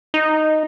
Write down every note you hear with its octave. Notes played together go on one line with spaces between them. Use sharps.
D#4